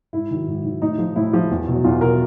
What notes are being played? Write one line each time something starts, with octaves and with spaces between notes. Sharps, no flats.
G#2 E4
D#3 F#3
G#2
D#3 F#3
A2 D#4
F3
A2 E4
F3
E2
B2 F#3
E2 F4
B2 F#3 A#4